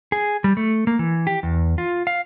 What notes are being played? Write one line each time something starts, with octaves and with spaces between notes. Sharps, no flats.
G#4
G3
A3
A#3
E3
G4
E2
F4
F5